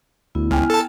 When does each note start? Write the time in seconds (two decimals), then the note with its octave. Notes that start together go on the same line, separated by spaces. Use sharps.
0.35 D2 B3 E4
0.51 C#2 G5 G#5 F6
0.70 A4 A5